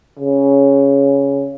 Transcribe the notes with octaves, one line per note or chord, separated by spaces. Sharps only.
C#3